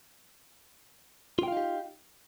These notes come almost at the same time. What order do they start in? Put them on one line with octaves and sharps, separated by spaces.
F4 G5 F5 D#4 G4